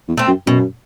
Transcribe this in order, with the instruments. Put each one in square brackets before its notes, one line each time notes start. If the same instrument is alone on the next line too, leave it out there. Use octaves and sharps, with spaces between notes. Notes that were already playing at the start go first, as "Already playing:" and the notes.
[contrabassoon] E2
[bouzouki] A3 C4
[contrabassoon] F#2
[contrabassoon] F#2 [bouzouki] B2